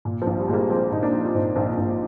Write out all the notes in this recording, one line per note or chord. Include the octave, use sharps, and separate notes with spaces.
A#2
F3
A#1
G3
A#2 G3 G#3 A#3
F3 G#3 C4
A#2 D#4
A#3 D4
F3
F4
A#2 C4 D#4
A#1
A#1